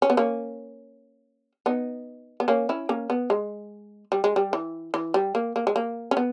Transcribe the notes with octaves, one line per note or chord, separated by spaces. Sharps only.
C#4
B3
A#3 C#4
B3 D#4
B3
A#3 C#4
C#4 E4
A#3 C#4
B3
G#3
G3
G#3
G3
E3
E3
G3
A#3
A#3
G#3
A#3
C#4
B3